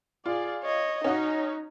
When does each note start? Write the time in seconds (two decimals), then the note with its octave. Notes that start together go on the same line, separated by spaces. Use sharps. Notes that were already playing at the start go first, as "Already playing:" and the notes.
0.25 F4 G#4 D5
0.64 C#5 D#5
1.04 C#4 D#4 F#4 D#5